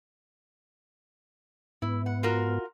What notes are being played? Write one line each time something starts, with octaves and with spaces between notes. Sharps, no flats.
G#2 B3 E4
F#5
F4 F#4 A#4